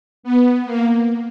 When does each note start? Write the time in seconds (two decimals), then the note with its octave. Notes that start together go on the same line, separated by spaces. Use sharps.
0.23 B3
0.65 A#3